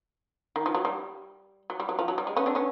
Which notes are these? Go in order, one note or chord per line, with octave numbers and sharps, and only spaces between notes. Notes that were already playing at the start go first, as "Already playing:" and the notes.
D#3
F3
F#3
G3
F#3
G3
F#3
F3
F#3
G3
G#3
B3 C#4
C4 D4
B3 C#4